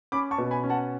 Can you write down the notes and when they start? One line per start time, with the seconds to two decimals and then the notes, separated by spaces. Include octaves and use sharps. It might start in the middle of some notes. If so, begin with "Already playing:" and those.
0.12 C#4 B5 D6
0.31 A5 C#6
0.38 B2
0.51 G#5 B5
0.64 C#4
0.69 F#5 A5